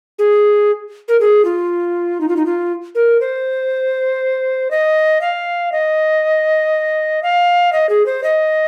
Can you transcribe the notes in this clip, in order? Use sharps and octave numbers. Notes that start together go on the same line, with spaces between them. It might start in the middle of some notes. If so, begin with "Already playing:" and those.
G#4
A#4
G#4
F4
D#4
F4
D#4
F4
A#4
C5
D#5
F5
D#5
F5
D#5
G#4
C5
D#5